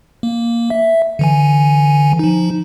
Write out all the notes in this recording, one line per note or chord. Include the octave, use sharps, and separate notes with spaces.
A#3
E5
D3 E3 G#5
F3 D#4